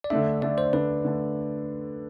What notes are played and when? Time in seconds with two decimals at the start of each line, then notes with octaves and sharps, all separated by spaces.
0.04 D5
0.10 D3 A3 D4 E5
0.42 D3 A3 D4 D5
0.58 C5
0.73 D3 A3 D4 B4
1.05 D3 A3 D4